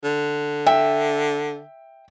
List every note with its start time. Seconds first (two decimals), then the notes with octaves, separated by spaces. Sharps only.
0.04 D3
0.66 E5 G5